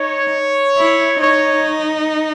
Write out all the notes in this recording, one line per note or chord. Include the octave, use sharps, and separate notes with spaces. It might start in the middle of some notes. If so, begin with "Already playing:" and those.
Already playing: D#4 C#5
E4
D#4 C#5